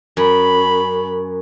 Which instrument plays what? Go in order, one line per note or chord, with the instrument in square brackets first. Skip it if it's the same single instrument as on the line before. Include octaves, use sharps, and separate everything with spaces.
[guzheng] F#2 [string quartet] B5